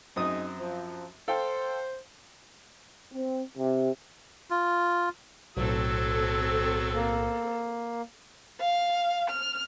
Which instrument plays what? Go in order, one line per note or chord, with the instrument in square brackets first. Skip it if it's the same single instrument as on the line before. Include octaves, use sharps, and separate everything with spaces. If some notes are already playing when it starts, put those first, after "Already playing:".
[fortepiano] F#2 C4 D#6 [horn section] D#4 G#4 D#5
[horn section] F3
[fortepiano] A4 F5 G5 [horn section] C5
[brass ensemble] C4
C3
[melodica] F4
[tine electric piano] B1 A2 [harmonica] F#3 E6 [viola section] C4 A4
[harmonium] A#3
[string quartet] F5
F6